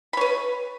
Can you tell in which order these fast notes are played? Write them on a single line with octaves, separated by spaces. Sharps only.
B5 C#5 B4